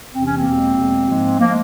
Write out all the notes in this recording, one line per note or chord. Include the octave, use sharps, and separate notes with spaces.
E2 C3 E3 C4
C#4
A#3 C4
E2 B2 G#3
E2 B2 G#3
G#2 F3 G#3
F3 G#3 A#3